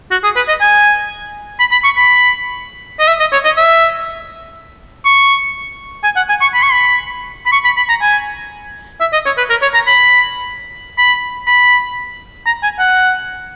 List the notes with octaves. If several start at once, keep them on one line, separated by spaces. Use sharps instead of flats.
F#4
G#4
B4
D#5
G#5
B5
B5
C#6
B5
D#5
E5
D#5
C#5
D#5
E5
C#6
G#5
F#5
G#5
C#6
B5
C#6
B5
B5
C#6
B5
B5
A#5
G#5
E5
D#5
C#5
B4
A#4
C#5
A#5
B5
B5
B5
A#5
G#5
F#5